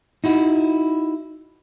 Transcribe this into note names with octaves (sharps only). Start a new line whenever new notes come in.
D#4 E4 F#4